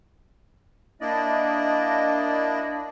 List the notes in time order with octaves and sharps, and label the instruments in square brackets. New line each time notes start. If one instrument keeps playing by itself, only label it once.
[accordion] A#3 D4 E4 D5 D#5